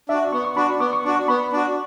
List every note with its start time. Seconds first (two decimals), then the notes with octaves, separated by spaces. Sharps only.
0.09 D4 F#4 E5
0.33 B3 C#6
0.45 C#6
0.56 D4 F#4 B5
0.68 C#6
0.80 B3 D6
0.93 C#6
1.05 D4 F#4 C#6
1.16 C#6
1.28 B3 B5
1.53 D4 F#4